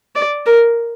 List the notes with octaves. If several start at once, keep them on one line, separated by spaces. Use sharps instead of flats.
D5
A#4